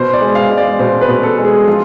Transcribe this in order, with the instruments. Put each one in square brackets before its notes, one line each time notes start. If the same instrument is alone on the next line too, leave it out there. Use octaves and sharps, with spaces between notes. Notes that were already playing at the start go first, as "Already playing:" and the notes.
Already playing: [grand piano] B2 C5
D5
G#3
F5
G#3
D5
B2 C5
B4
B2
A4
G#3
G#4
F3 F4